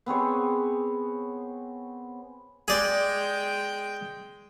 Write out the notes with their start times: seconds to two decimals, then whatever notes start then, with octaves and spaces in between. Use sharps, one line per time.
0.06 B3 C4 G#4 C#5
2.68 G#3 G#4 D5 G5